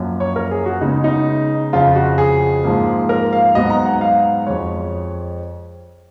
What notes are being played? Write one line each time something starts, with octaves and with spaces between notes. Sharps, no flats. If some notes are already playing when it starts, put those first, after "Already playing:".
Already playing: F#2 F3 A#3
C#5
A#4
G#4
F#4
C#3 G#3 B3 D#4
D#4
F2 C#3 F3 F4
F#4
G#4
G#2 F3 A#3
A#4
F5
G#2 F#3 B3 D#5
A#5
F#5
F5
F2 F3 G#3 C#5